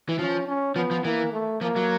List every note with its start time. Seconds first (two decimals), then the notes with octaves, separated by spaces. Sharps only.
0.09 E3
0.19 F3 C#4
0.48 C#4
0.76 F3 B3
0.91 F3
1.04 E3 A#3
1.33 A3
1.61 F3 A#3
1.76 F#3